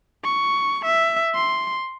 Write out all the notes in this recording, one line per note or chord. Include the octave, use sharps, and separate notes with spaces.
C#6
E5
C6